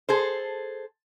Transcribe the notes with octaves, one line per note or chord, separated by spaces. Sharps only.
G#4 A4 C5